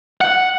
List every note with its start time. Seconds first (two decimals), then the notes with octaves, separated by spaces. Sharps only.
0.21 F#5